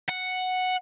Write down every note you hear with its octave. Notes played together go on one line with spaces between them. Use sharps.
F#5